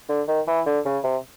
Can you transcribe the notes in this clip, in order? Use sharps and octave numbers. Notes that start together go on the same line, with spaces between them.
D3
D#3
E3
D3
C#3
C3